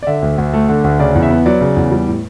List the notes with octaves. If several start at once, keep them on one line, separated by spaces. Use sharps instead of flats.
D5
D3 E5
D2
D2
A3
D3
D2
C#3 D5
E2
E5
B3
F#3 D5
C#3
E2
G3
A2